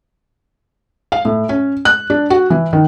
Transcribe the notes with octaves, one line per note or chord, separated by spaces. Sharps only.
F5
A2
C#4
F#6
D4
F#4
E3
D#3